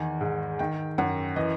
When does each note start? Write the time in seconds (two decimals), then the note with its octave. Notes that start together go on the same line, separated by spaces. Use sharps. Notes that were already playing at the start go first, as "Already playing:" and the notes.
Already playing: E2 D#3 G#5
0.21 G#2
0.59 D#3 G5
0.98 F#2 F#5
1.36 E3 D#5